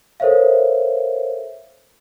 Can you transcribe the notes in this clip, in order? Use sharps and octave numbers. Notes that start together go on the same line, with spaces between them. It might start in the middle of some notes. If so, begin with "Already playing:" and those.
A4 A#4 C5 C#5 E5 F5